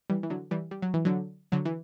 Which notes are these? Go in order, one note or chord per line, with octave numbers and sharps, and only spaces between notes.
E3 G3
E3
D3 F#3
E3 G3
G3
F#3
E3
D3 F#3
D3 F#3
E3